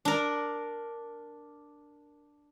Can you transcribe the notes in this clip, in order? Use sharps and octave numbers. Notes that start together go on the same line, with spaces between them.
D4 A#4